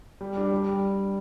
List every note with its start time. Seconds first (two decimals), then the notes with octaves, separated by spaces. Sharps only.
0.21 G3
0.36 D4 G4
0.52 G3